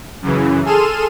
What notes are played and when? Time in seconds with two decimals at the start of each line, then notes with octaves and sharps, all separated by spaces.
0.22 F#2 C#3 E3
0.65 G#4 A4 C6 F6 D#7 E7